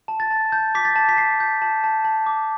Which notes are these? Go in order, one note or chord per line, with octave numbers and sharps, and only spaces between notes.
A5
A6
A5
A5 G6
D6 B6
A6
A5
B6
A5 C7
G6
A5
A5
A5
D6